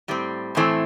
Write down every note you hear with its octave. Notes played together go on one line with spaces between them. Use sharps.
A2 G3 C4
A2 E3 A3 C4 E4